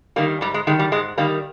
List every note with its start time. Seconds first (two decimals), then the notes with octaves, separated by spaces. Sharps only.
0.16 D#3 G3 A#3
0.41 G#2 G3
0.54 G#3
0.67 D#3 G3 G#3
0.79 G3
0.92 G#2 G#3
1.18 D#3 G3 A#3